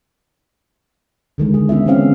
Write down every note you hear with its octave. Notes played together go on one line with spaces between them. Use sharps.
D3 D#3 G#3
D#3 G#4
B3 C#4 E4 F4 E5
D3 E3 C4 C#4 F5